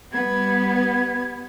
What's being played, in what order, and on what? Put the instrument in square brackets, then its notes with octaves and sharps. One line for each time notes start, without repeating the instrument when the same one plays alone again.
[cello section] G3 B3 [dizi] G#6